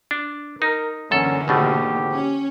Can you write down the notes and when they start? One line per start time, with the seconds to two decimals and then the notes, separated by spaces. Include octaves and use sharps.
0.11 D4
0.62 D#4 A#4
1.11 F#2 D3 E3 A#3 C#4 A4
1.48 G#1 B2 A3 G4
2.13 C#4